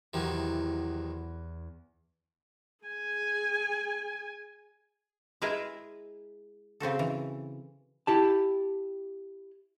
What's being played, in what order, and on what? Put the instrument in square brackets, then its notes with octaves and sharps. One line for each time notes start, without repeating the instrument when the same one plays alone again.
[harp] E2 [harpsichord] C3 D#3 F#3
[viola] G#4 G#5
[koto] G#3 E4 G#4 A#4 B4 E5
C#3 C4 F#4 A4
E3
[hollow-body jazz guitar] E4 G4 A5